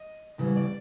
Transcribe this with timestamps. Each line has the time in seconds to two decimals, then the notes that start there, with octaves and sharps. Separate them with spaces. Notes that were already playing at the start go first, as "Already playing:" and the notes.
Already playing: D#5
0.38 D2 C#3 E3 G3
0.56 D5